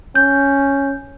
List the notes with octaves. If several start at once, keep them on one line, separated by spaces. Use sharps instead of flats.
C#4 G6